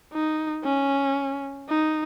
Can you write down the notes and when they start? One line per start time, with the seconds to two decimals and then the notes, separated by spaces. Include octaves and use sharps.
0.13 D#4
0.65 C#4
1.69 D#4